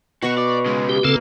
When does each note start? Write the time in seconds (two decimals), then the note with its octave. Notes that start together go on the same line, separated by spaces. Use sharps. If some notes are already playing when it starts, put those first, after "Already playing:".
0.22 B2 F#4 C#6
0.38 D5
0.66 C#3 G#3
0.89 G4
1.04 C#3 A#3 C4 A4